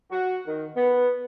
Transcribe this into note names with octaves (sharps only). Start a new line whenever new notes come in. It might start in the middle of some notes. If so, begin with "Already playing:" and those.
F#4
D#3
B3